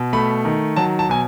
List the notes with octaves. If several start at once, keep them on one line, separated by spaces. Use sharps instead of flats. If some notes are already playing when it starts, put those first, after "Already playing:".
Already playing: B2
A3 B5
D#3
F#3 A5
A5
B2 G#5